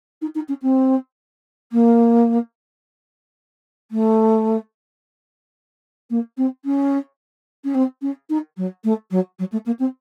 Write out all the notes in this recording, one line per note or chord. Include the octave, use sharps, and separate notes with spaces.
D#4
D#4
C#4
C4
A#3
A3
A#3
C4
C#4
C#4
C4
C#4
D#4
F#3
A3
F#3
F#3
A3
A#3
C4